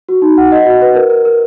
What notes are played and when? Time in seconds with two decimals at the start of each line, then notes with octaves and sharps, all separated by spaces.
0.09 F#4
0.22 D#4
0.37 F#5
0.52 D#5
0.66 F#4
0.82 B4
0.95 A#4
1.10 A#4
1.25 A#4